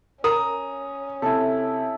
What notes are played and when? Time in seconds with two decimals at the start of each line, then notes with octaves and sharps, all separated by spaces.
0.24 C#4 A#4 A#5 D#6
1.22 C3 E4 A4